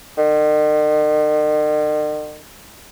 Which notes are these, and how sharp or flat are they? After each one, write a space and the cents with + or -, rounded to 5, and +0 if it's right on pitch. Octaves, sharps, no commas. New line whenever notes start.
D#3 -45